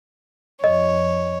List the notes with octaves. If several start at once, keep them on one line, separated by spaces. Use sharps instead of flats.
F2 C#5 D#5